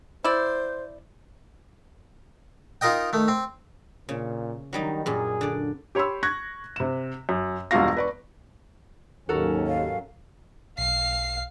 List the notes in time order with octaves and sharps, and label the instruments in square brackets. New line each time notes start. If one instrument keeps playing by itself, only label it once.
[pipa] E4 D5 [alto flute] C5
[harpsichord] D#4 F4 A#4 D#5 G5
D#3 A3
C4
[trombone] A#2 [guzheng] C#3
[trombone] D#3 [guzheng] F#3 G3 D#4
[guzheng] F#2 A#2 [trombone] G#4
[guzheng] D3 D5
[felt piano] G4 C#5 B5 C6 E6
C#6 F#6 G#6 A#6
C3 E7
F#2
E1 G2 F4 F#4 F5 A#6
B4 D5 C#6
[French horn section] D#2 [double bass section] G#2 F#3 C#4 [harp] F#4 A4 A#4
[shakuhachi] F5
[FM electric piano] B1 [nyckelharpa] F5 [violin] C7